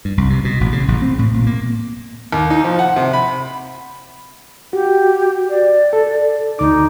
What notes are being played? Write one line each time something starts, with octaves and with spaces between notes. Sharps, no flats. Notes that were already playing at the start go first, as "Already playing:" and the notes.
G2
C2
C3
B2
A1
C#3
A1
C4
A2
A#2
A#3
D#2
D#4
F3
F#5
C3
B5
F#4 G4
D5
A4
D2 D#4 D6